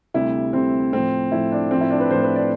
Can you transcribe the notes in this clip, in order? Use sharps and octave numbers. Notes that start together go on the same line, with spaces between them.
D2 C3 G3 E4
D2 C3 G3 C4
A2 F3 C4
A2 F3 E4
D4
A2 F3 C4
E4
D4
B4
A2 F3 C5
B4
D5